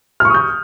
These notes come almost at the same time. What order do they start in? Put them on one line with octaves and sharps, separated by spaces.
F6 C#6 D#6 G6